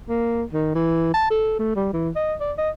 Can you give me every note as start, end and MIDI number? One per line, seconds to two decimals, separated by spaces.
0.09 0.43 58
0.52 0.71 51
0.75 1.12 52
1.14 1.29 81
1.30 1.55 69
1.59 1.75 57
1.76 1.89 55
1.93 2.10 52
2.16 2.34 75
2.40 2.52 74
2.58 2.70 75